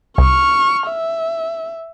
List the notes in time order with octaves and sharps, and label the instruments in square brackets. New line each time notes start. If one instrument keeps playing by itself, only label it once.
[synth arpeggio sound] C2 [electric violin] C#6 F6
[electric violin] E5